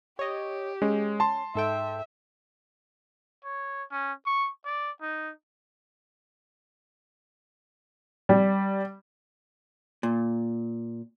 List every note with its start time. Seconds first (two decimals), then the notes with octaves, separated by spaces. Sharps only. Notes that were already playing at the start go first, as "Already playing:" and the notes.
0.19 G4 C#5 D#5
0.82 G#3 C#4
1.20 A5 C6
1.55 G#2 A4 E5 G5
3.44 C#5
3.92 C#4
4.26 C#6
4.65 D5
5.02 D#4
8.29 G3
10.03 A#2